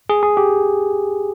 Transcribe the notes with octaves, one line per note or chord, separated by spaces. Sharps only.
G#4
G#4
G4